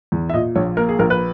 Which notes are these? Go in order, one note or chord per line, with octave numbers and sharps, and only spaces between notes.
E2
E5
A#2 D#5
A#1 C#5
A#3 A#4
G#4
A#1 A#4
B4